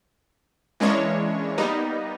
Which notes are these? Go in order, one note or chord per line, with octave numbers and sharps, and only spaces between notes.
E3 G#3 A#3 C#4 D4 C#5
G3 A#3 B3 D#4